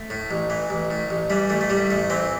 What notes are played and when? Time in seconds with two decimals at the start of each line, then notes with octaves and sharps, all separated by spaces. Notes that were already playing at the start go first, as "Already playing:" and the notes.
Already playing: A3
0.10 A2
0.31 A1
0.50 E3
0.70 A1
0.91 A2
1.10 A1
1.30 E3 G3
1.49 A1 A3
1.61 A3
1.70 A2 G3
1.90 A1 A3
2.10 E3 C4